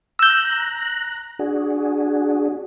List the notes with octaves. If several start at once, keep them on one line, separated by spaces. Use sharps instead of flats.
A#5 E6 F#6 G6
D4 F#4 G#4